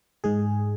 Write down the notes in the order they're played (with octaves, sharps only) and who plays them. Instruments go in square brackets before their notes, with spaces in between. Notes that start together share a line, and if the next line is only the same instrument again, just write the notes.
[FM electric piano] G#2 G#3 G#4